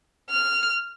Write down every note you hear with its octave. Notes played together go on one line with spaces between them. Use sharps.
F6